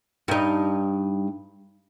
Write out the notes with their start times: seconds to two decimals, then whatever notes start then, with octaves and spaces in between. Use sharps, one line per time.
0.28 G2 D#4